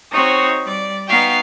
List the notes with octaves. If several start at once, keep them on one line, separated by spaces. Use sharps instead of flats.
C4 D#4 F#4 C#5
G3 D5
B3 D#4 F#4 F5 G5